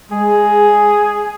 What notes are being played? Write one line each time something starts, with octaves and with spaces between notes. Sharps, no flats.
G#3 G#4